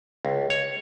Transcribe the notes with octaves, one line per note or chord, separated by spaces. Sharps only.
C#2
C#5